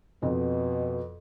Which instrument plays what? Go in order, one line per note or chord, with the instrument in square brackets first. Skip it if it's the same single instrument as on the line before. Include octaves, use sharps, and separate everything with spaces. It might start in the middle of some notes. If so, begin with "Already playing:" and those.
[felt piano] F2 [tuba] B2